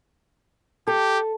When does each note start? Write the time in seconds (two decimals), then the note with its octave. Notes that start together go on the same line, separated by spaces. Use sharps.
0.87 G4 A4